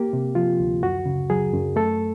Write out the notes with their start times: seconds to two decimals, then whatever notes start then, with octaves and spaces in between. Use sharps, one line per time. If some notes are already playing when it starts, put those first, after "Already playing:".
Already playing: A#3 G4
0.13 C3
0.35 F3 F4
0.60 D2
0.83 F#2 F#4
1.06 C#3
1.30 F#3 G#4
1.53 F#2
1.76 A3 A4